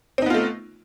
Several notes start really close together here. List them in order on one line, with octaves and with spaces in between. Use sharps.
C4 D#4 B3 F4 A3